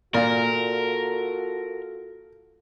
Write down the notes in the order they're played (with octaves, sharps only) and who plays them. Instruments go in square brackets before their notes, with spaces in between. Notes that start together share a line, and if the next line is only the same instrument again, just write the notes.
[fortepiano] A#2 [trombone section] F4 F#4 A4 [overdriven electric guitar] A#4 [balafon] D5